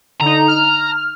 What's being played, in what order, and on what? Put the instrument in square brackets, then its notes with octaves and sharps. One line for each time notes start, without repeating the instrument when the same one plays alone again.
[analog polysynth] D3 D#4 [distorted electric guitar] A#5
[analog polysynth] F6